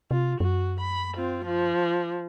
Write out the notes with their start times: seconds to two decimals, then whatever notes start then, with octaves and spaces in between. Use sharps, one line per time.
0.11 C3 F4
0.40 F#2 F#4
0.80 B5
1.17 C4 F4
1.45 F3